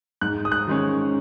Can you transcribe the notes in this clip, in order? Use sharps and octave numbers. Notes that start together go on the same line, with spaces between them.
G#2 F#6
D#6
F#6
D#3 G#3 C#4